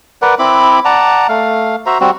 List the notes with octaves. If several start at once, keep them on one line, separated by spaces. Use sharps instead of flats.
A#4 B4 D5 F#5
C4 E4 B5 D6
D5 F#5 A5 A#5
A3 F5
F#4 C5 E5 A#5
G3 C4 F#4